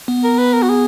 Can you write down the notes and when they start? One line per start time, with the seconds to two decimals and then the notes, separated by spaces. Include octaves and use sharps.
0.08 B3
0.24 A#4
0.38 B4
0.53 A#4
0.63 F#4
0.69 G#4